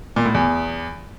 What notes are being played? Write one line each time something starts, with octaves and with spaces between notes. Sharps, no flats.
A#2
A2
E2